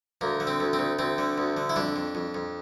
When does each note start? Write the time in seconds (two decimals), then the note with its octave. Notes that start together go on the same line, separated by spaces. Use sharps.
0.21 D2 A#3
0.40 D3
0.47 C4
0.60 D2
0.73 C4
0.79 D2
0.99 D2 C4
1.18 D3
1.38 D2
1.57 D3
1.69 E4
1.76 F2 D4
1.96 F2
2.15 F2
2.34 F2